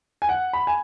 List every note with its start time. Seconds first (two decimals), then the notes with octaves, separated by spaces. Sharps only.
0.22 G#5
0.29 F#5
0.53 B5
0.67 G#5